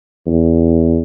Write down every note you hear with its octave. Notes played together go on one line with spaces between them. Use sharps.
E2